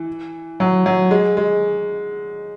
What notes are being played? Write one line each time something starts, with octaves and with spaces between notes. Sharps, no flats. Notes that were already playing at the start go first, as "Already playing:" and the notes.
Already playing: E3
F#3
F#3
G#3
G#3